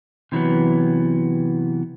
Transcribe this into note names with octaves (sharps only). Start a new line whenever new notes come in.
C3 E3 F#3 B3